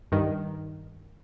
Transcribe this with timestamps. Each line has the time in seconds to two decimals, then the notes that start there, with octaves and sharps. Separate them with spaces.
0.12 G2 D#3